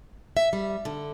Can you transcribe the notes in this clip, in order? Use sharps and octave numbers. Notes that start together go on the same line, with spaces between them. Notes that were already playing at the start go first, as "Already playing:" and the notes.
E5
G3
D3